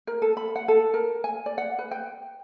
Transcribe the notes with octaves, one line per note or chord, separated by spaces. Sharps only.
A#4
A4
B5
F#5
A4
A#4
G#5
D5
F#5
B4
G5